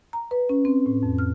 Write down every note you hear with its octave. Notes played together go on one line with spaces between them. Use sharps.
A#5
B4
C#4
C4
A2
F2
F6